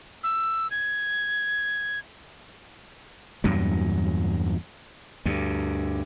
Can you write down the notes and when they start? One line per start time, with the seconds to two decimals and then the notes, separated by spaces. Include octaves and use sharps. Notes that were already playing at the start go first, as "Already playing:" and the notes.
0.23 E6
0.71 G#6
3.44 E2 G2 A#2 F#3
5.25 D2 G2